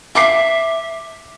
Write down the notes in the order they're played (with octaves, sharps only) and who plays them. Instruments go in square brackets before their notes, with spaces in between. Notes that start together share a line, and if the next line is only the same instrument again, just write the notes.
[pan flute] E5 [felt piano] D6 C7